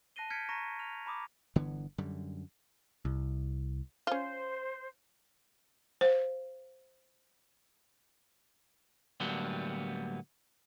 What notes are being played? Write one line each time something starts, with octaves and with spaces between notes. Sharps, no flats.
A5 F#6 A#6 C7 D#7 G7
F6 G6 G#6 B6 C#7 D7
A#5 C#6 A#6 D#7
F6 F7
A#5 B5 D6 D#6
G1 D3 E3 B3
F#2 D3 G3
C2
C#4 F4 C5
C5 F5
A2 D3 F#3 G3 A#3 B3